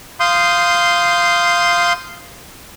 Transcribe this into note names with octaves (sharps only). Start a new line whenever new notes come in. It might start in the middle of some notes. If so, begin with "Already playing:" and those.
F5 C6 D#6 G6